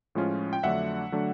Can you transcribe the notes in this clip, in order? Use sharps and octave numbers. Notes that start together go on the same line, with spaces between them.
A2 F3 G#3 C#4 F4
G5
F2 D3 F#3 A3 D4 E5 F#5
D3 F#3 A3 D4